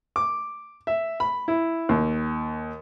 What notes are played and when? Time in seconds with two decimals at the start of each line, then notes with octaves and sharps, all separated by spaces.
0.16 D6
0.87 E5
1.20 B5
1.48 E4
1.89 D#2